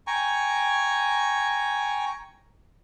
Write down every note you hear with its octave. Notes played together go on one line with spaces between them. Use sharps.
G5 G#5 A#5 C#6